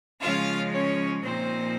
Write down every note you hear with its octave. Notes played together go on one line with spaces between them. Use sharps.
C#3 F3 G#3 C#4 F4 F5
C#4 C#5
A#2 F3 A#3 C4 D#4 C5